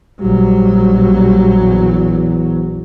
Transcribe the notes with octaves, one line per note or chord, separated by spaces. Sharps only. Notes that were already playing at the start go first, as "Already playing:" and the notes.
A#1 F#3 G3
E2